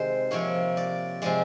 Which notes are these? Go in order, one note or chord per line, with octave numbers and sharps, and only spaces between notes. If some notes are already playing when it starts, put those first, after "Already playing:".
Already playing: C3 D#3 G#3 C5
C3 F3 A#3 C#5
D5
C3 F3 G#3 D5